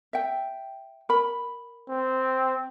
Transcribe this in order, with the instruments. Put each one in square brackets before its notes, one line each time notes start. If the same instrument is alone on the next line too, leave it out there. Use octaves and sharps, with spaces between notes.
[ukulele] E5 G5
A#4 B5
[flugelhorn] C4